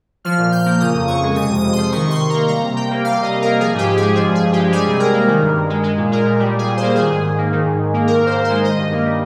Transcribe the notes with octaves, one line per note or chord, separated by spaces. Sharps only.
F3 F6
A#2
A#2 G6
A#3
C#3 D#6
F2
F2 C#6
G#3
C3 D#6
F2
D#6
F2
F3 C6
D#3 C#6
C3 C6
C3
A#3 A#5
G3 A#5
C3
C3 G5
A#3
G3 F5
C3 D#5
C3
A#3 A#4
F3 G#4
G#2 G4
G#2
G#3 G#4
F3 G#4
G2
G#4
G2
G4
G#3
G3 G#4
C3
C3 A#4
A#3
D#3
G2
G2
G#3
G#3
A#2
G#3 A#4
A#2
G3
A#2 G#4
A#2
C5
A#3
D#3 G#4
G#2
G#2
A#3
D#3
G#2
G#2
A#3
D#3 A#4
G#2 C5
G#2
C5
G#3
D#3 D#5
G2
A#3
G3